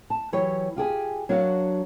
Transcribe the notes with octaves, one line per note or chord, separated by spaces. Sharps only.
A5
E3 F#3 F#4 G4 C#5
F4 G4 G#4 G#5
F#3 D4 F#4 A#4 F5 F#5